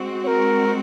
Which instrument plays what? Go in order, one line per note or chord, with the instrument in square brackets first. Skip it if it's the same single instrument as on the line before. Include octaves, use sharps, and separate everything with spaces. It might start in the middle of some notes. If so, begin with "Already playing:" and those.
Already playing: [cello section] G#3 C4 F#4
[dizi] C#5
A#4